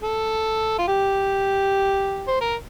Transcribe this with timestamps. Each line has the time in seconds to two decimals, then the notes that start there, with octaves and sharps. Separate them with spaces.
0.03 A4
0.78 F4
0.88 G4
2.28 C5
2.41 A#4